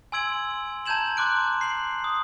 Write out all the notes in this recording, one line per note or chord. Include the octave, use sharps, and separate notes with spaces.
G#5 C6 E6 G#6 D7 F#7
A5 A#5 G6 G#6 E7 F#7
C6 D6 F#6 D7
C7 F#7
D#6